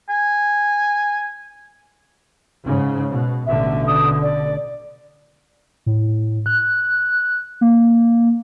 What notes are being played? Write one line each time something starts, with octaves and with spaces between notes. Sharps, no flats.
G#5
G#2 C#3
B2
A1 B2 D3 E5
D#6
D5
A2
F#6
A#3